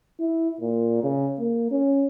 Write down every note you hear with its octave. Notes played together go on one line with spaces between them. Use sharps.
E4
A#2
C#3
A#3
C#4